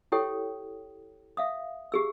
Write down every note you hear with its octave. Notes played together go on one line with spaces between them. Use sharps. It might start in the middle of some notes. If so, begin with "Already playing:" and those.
E4 G4 A4 C#5 G5 D#6
E5 F5 D#6
G4 G#4 E6